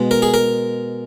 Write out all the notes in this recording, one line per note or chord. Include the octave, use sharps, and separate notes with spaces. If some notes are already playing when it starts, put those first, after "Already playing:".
Already playing: B2 G#3
A#4
G#4
A#4